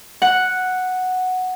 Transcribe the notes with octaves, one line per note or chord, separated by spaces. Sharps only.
F#5